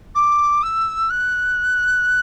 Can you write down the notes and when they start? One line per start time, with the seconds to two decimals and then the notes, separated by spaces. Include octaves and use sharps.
0.15 D6
0.62 E6
1.10 F#6